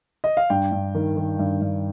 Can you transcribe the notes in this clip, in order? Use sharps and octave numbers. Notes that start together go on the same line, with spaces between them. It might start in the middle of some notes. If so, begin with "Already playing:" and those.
D#5
F5
G2 G5
G2
D#3
D#3
G2
G2